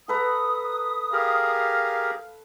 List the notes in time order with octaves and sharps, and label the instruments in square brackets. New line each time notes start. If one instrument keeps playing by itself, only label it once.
[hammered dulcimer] A4 B4 A#5 [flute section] D#6
[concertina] G4 G#4 A#4 [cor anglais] F5